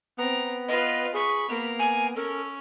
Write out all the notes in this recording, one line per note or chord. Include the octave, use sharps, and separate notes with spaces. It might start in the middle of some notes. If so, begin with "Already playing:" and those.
B3 C4 A#5
F4 B4 D#5
G#4 B5 C#6
A#3 B3
G#5
C#4 A4 A#4